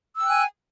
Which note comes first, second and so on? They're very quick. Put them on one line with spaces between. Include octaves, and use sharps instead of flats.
E6 G5 F#6 G#5